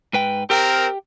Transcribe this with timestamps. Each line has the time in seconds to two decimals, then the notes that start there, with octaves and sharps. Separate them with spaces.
0.13 G#2 B4 G5
0.50 C4 G4 A#4 G5